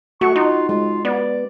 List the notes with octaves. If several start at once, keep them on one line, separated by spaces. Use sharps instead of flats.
A3 F#4 C#6
D#4 F4
G#3 F4
B3 D5